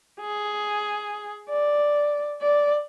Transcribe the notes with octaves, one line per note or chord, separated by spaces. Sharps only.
G#4
D5
D5